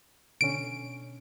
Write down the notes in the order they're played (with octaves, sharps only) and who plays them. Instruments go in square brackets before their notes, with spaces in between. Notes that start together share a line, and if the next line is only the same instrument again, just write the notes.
[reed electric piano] B2 D3 C#4 [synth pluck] D7